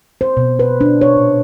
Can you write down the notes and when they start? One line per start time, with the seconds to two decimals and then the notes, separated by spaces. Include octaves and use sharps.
0.21 C5
0.37 B2
0.59 B4
0.81 D4
1.01 C#5
1.17 A#2